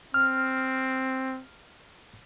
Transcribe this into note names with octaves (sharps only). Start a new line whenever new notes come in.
C4 F6